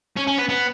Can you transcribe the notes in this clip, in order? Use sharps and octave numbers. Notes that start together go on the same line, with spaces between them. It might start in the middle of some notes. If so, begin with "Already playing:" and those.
C#4
C#4
B3
B3